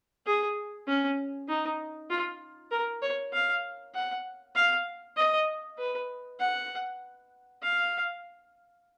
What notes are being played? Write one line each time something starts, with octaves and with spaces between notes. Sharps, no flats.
G#4
C#4
D#4
F4
A#4
C#5
F5
F#5
F5
D#5
B4
F#5
F5